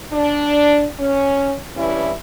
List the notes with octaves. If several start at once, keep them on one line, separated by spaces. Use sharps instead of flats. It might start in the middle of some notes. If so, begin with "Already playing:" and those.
D4
C#4
G2 E3 G3 C#4 E4